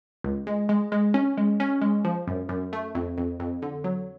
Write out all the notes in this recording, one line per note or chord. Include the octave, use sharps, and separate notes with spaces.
C#2
G#3
G#3
G#3
C#4
G#3
C#4
G#3
F3
F#2
F#2
A3
F2
F2
F2
D3
F#3